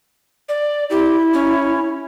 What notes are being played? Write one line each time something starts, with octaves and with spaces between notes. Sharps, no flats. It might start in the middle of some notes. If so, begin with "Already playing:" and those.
D5
E4 G4
C#4